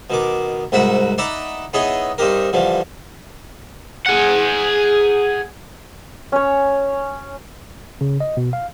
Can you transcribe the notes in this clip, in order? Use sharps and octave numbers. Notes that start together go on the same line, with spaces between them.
B2 D#3 D6
C2 G#2 F#4 E5 F#5 B5
D#4 D5 E5 F#5 A#5 B5
B3 D#4 E4 G#4 C#5 D#5
G2 C4 D#4 G4 A#4
G2 D3 E3 F3
G#4 F#5
C#4 C#5
C#3
D#5
B2
F5